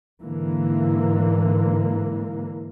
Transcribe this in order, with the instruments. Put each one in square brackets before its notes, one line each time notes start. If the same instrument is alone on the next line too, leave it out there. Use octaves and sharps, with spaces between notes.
[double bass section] G#2 D3 E3 A#3